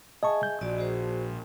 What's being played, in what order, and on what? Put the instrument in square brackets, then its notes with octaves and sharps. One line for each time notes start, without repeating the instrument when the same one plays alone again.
[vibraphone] G#4 E5 G#5 [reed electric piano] D#5 A5 C#6
[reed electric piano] G6
[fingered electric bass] A#1 [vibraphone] F#4 D5 D#5
[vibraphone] F#4 G#4 C5